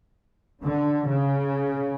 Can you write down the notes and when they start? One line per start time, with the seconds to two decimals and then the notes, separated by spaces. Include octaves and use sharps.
0.62 D3
1.07 C#3